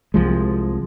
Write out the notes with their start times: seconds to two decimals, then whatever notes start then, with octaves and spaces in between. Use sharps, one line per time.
0.14 C2 F3 G#3